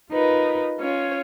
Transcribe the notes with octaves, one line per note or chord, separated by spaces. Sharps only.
D#4 F4 A#4 B4
C#4 F4 C#5